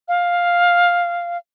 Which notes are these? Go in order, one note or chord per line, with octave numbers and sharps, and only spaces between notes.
F5